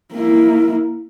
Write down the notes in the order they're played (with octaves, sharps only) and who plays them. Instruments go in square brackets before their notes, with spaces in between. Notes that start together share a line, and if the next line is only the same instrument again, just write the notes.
[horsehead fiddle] A#3 E4